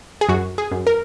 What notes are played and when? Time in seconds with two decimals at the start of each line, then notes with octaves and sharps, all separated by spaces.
0.21 G#4
0.29 F#2 F#4
0.58 G#4
0.71 F#2
0.87 A#4